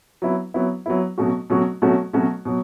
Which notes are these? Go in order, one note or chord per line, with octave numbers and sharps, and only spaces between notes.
F#3 B3 E4
F#3 B3 E4
F#3 B3 E4
B2 F#3 A3 C#4 F#4
B2 F#3 A3 C#4 F#4
B2 F#3 A3 C#4 F#4
B2 F#3 A3 C#4 F#4
B2 F#3